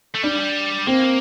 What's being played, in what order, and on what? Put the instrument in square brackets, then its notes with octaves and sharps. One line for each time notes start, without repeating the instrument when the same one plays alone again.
[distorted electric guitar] A3
[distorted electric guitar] G3 [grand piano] D4
[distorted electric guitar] A#3 [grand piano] C4